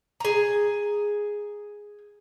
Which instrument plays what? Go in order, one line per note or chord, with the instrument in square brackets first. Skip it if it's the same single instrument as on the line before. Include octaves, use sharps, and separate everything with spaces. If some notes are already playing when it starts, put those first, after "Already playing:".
[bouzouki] G#4 A#5